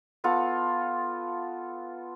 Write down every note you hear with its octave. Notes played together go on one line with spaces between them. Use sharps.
B3 F4 A4